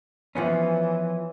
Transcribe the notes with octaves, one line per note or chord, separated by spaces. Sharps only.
E3 F3 B3 C#4